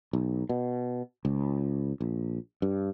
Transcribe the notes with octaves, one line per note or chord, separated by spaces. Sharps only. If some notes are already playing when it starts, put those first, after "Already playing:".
B1
B2
C#2
A#1
G2